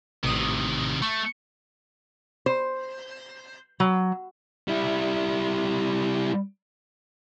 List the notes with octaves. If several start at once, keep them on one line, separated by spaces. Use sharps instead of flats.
A1 C3 D#3 D#6
A3 C#6
C5
F#3
G3 E4